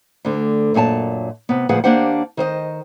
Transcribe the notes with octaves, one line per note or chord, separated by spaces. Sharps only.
D2 D3
F#2 A#2 C#5 G#5 A5
C3 B3
D2 A#2 F3 G#4 B4 F#5
D#2 A#3 D4 G4 C5 F#5
D#3 C5 D#5